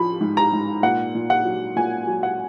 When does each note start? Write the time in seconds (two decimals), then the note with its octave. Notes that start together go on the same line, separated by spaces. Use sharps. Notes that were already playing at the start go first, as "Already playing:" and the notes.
Already playing: F3 B5
0.21 G#2
0.37 A#5
0.53 G#2
0.83 A#2 F#5
1.15 A#2
1.30 F#5
1.45 F#3
1.76 A#2 G#5
2.07 F#3
2.23 F#5